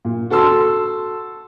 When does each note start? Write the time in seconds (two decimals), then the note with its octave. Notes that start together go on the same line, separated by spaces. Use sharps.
0.05 A#2
0.30 F#4 A4 A5 C6 E6